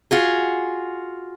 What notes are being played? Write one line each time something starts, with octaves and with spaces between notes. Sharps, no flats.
F4 F#4 G#4